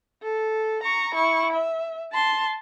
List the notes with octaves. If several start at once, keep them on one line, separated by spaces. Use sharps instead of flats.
A4
A#5 C#6
E4 C#6
E5
A5 C6